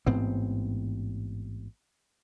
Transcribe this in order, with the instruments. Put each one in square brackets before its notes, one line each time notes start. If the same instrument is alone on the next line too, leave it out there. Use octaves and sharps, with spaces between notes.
[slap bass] A1 G#2 B3 C4